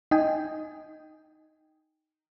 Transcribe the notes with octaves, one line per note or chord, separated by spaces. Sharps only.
D#4 D#5 G5 G#5